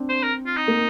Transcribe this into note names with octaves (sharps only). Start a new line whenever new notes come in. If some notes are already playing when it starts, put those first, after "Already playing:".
Already playing: C4 D4
C5
A#4
F4
D#4
A#3